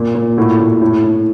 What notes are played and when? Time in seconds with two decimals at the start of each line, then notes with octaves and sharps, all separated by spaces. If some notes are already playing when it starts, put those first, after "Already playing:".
Already playing: A#2
0.15 A#2
0.37 A2 F#4
0.60 A2
0.81 A2
1.04 A2